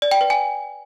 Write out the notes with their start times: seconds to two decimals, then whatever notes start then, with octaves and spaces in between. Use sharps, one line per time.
0.02 D5
0.11 G5
0.21 B4
0.30 G#5